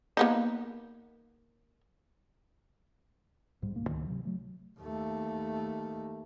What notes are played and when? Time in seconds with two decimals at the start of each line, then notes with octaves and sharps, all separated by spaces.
0.17 A#3 B3 D#4
3.62 B1 G#2 G3
3.75 D1 G#1 B2 A#3
3.88 C#2 G#2 D#3
4.07 C3 F#3
4.25 F#3 A3
4.80 D#2 A3